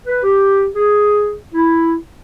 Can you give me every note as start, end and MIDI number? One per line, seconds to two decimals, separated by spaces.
0.07 0.23 71
0.23 0.67 67
0.75 1.34 68
1.54 1.95 64